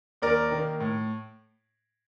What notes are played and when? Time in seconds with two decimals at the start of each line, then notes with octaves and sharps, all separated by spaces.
0.22 D#2 A#4 D5
0.51 D#3 A#3
0.80 A2